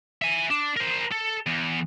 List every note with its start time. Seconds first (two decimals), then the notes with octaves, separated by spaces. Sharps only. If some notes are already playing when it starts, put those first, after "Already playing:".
0.22 E5 G#5
0.51 D4
0.77 A#4 C5
1.11 A4
1.47 E2